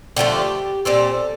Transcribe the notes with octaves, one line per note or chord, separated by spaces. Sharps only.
D3 F3 A3 G4
A#2 G3 C4 A4